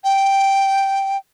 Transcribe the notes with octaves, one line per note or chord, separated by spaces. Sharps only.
G5